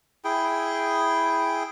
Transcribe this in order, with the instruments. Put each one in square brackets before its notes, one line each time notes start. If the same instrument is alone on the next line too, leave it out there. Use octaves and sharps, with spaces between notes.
[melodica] E4 G#4 G5